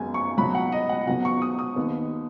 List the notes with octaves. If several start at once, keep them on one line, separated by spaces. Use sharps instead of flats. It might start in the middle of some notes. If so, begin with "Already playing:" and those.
Already playing: G#1 F#2 D#3 G#3 B3 G#5
C#6
C#2 B2 F#3 B5
F#5
D#5
F#5
C#2 B2 F#3 B3 F#5
C#6
D#6
D#6
D#2 D#3 B3